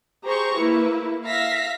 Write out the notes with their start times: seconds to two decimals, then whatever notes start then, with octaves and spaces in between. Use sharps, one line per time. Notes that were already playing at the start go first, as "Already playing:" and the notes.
0.24 G4 G#4 C5 A#5 C#6
0.58 A#3 E4 B4
1.25 E5 F5 A#6 B6